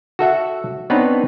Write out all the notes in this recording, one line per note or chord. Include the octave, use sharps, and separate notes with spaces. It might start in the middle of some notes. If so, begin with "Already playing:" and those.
F#4 A4 E5 F#5
B3 C4 D4 D#4 B4 C#5